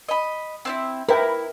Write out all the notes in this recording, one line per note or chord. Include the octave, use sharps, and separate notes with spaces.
D#5 B5
C4 D4 E4
E4 A#4 B4 G5